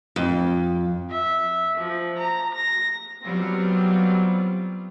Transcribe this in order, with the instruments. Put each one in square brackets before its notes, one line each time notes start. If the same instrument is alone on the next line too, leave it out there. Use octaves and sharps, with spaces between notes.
[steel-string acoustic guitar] F2
[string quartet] E5
F3
A#5
A#6
[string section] F#3 G3 B3 C4 F4